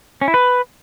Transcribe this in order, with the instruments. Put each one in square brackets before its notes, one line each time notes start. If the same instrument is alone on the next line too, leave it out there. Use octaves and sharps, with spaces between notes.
[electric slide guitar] C#4
E4
B4